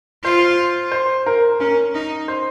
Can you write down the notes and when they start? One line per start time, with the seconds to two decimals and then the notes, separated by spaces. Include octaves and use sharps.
0.24 F4 C5
0.92 C5
1.26 A#4
1.60 C#4 A#4
1.95 D#4
2.28 C5